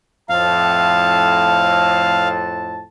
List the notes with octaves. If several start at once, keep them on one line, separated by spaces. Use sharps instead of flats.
F2 A2 F5 A5